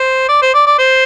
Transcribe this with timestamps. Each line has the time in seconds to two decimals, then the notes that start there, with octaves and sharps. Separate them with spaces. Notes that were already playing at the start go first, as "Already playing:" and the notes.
Already playing: C5
0.28 D5
0.42 C5
0.54 D5
0.66 D5
0.79 C5